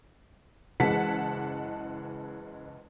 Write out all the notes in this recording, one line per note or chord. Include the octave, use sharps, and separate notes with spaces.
F#1 E3 G#3 F#5 A5 B6